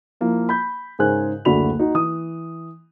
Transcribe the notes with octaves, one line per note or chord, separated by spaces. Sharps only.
F3 A#3 E4
B5 G6
G#2 C#3 A#4 C5 G#5 F#6
F#1 D2 D3 F#4 B5 F7
D#4 F#4
E3 D#6